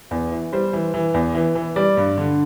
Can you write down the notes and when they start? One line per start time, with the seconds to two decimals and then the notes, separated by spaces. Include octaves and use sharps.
0.11 E2
0.32 E3
0.52 G3 C5
0.73 E3
0.94 E3
1.14 E2
1.35 E3
1.55 E3
1.76 G3 D5
1.97 G2
2.18 D3